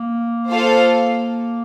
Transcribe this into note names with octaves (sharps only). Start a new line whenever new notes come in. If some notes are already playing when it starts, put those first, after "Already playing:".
Already playing: A#3
F4 A4 C5 F5